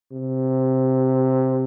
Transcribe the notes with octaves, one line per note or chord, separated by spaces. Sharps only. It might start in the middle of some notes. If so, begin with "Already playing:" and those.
C3